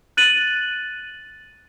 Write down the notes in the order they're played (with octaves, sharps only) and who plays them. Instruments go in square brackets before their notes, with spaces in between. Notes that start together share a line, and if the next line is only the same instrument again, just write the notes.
[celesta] F#6 A6 D#7 F#7